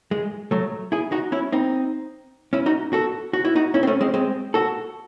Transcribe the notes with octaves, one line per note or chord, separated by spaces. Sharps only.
G#3
F#3 A3
E4 G#4
D#4 F#4
C#4 E4
C4 D#4
C#4 E4
D#4 F#4
F#4 A4
F#4
E4
D#4 F#4
C#4 E4
C4
A3 C#4
G#3 C4
G#3 C4
F#4 A4